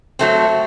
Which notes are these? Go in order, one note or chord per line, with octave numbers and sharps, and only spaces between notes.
F#3 A3 C4